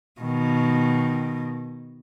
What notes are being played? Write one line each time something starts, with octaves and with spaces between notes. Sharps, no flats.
B2 D#3